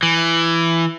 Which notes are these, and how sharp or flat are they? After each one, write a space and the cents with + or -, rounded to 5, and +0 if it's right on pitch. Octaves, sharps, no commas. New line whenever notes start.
E3 +15